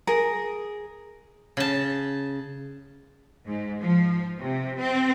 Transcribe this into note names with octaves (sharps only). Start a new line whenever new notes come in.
G#4 A#4
C#3 A5
G#2
F3
C3
C4